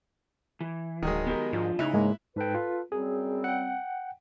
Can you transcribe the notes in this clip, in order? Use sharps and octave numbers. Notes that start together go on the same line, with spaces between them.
E3
D1 D#3 F#3 G#3
B3 G4 A#4
G#2 F3 D4 F4
A2 C#3 D#4 E4 F#6
G#2 G#3 A#3
G#2 A4 B4 G5
F4
F#2 G3 C4 G#4
F#5 G5